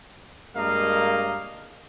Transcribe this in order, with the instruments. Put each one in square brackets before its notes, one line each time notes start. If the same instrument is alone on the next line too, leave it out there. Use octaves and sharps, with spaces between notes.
[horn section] G2 G#3 A#3 A#4 D#5 F5